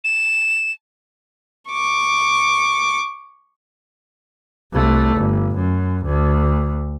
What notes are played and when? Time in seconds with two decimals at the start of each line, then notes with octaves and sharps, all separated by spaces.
0.04 E7
1.70 C#6 D6
4.73 C2 A3
5.17 G1
5.56 F#2
6.05 D2